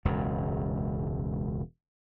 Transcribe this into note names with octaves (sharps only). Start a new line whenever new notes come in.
E1 C#2 F#2